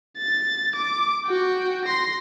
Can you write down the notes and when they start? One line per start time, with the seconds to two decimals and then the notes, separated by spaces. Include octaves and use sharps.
0.18 A6
0.75 D6
1.25 F#4 G5
1.85 C6 A#6